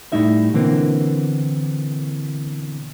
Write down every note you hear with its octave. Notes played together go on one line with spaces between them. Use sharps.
A2 G3 D#4 E5
B2 D3 E3 A#3 C4